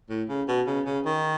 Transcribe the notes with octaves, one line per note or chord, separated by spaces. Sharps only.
A2
C#3
B2
C#3
C#3
D#3